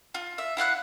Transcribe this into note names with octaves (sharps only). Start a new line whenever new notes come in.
F4
E5
E4 F5 F#5 F#6